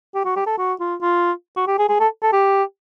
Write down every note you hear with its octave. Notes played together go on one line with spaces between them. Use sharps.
G4
F#4
G4
A4
F#4
F4
F4
F#4
G4
G#4
G#4
A4
A4
G4